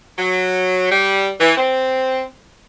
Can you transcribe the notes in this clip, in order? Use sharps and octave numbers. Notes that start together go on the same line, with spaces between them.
F#3
G3
E3
C4